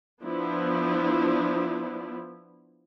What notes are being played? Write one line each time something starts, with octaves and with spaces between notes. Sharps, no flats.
F3 B3 D4 E4